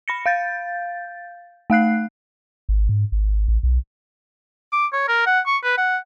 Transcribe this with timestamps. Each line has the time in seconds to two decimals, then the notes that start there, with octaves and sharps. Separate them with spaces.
0.08 B5 A#6 C#7
0.26 F5 G6 A6
1.70 A3 F5 F#6 C7
2.69 G#1
2.89 G#2
3.12 G#1
3.48 A1
3.63 B1
4.73 D6
4.93 C#5
5.08 A#4
5.27 F#5
5.47 C#6
5.63 B4
5.77 F#5